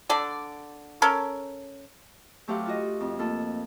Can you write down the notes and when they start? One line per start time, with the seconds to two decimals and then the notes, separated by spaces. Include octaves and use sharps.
0.09 D3 A4 D5
1.02 C#4 A4 A#4
2.48 F#3 A3 G4 C5 F5 F#5
2.66 F4 F#4 D#5
3.00 F2
3.19 A3 A#3 F4 A4